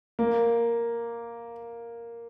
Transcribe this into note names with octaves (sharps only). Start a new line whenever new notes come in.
A#3